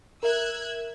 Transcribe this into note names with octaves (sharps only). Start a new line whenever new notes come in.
A#4 E5 E6 F#6 G#6